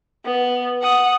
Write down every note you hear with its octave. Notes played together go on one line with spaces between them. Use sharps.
B3
F#5 D#6